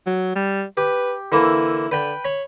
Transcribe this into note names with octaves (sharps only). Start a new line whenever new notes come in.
F#3
G3
G4 B4
D3 E3 A#3 E4
D3 B4 G5 B5
C#5 B5